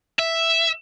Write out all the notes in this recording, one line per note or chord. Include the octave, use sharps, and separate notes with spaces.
E5